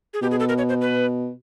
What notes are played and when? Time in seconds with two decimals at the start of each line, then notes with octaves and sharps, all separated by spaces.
0.14 G#4
0.22 B2 G4
0.31 G#4
0.40 A4
0.49 A#4
0.58 C#5
0.69 C5
0.81 B4